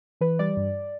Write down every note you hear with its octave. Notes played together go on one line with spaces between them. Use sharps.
E3 B4
G3 D5
G2